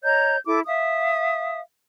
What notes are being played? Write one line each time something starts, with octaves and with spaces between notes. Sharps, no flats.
C#5 D#5 A#5 G6
E4 A4 D6
E5 F5 D#6